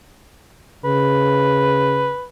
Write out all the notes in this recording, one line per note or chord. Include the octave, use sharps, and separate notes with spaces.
C#3 B4